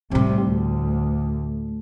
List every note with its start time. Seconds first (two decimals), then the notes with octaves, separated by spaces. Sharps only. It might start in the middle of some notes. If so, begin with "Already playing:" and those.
0.11 A2 C3 G3 A3
0.44 D2